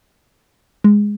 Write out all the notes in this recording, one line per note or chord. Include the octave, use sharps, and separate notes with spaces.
G#3